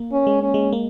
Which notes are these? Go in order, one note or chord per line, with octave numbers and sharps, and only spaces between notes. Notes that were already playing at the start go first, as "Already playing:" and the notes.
Already playing: A#3
C#4
G#3
C#4
G#3
A#3